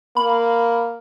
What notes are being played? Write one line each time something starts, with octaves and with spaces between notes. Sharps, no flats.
A#3 B5